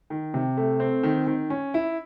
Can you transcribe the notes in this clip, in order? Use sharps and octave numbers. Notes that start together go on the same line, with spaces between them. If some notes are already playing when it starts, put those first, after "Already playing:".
D#3
C3
A3
C4
D#3
D#3
C#4
E4